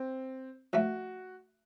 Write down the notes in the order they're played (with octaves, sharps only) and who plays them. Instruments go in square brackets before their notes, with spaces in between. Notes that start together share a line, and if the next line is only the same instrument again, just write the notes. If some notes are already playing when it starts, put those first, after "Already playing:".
Already playing: [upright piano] C4
[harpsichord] A2 F3 A3 [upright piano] F#4